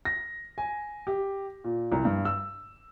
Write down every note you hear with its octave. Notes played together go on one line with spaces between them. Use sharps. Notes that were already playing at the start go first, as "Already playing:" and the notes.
A#6
G#5
G4
A#2
C2
G2
E6